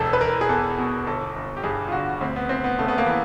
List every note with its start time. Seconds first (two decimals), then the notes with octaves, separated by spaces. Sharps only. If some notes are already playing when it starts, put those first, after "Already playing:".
Already playing: E1 E3 A4
0.13 B4
0.21 E1 A#4
0.41 G#4
0.49 E2 A4
0.78 B2
1.07 G1 A4
1.36 G1
1.57 G4
1.63 G2 G#4
1.88 F4
1.92 D3 F#4
2.21 D2 C4
2.36 B3
2.49 D2 C4
2.64 B3
2.79 C#3 A3
2.88 B3
2.98 A#3
3.06 E3